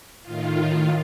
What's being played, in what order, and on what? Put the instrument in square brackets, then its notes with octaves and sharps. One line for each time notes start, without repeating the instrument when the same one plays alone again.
[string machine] A2 D#3 F4